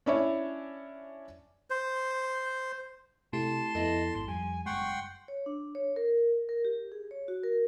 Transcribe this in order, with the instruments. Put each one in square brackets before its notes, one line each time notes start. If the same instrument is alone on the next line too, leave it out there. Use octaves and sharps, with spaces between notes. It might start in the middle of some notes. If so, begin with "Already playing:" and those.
[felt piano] C#4 D4 E4 C#5
[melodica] C5
[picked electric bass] C3 [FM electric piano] A3 E4 G4 [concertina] A5 C6
[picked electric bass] F2 [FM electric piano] B3 E4 A4 [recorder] D#5
[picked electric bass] G#1 [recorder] C6
[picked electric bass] F2 [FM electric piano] G3 [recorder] G#5
[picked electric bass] F#1 G#3 [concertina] F#5 G5 C6 [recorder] C#6
[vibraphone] C#5
D4
C#5
A#4
A#4
G4
G#4
C#5
F#4
A#4